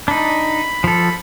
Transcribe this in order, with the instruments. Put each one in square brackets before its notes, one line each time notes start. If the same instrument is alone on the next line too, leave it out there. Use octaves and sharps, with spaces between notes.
[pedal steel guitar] D4 D#4 [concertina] B5
[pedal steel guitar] F3 A4